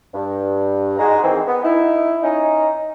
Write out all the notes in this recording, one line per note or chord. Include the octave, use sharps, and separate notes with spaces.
G2
G#2 G#3 F#4 G#4 A#5
D#3 E3 C4
B3
D#4 E4
C#4 D#4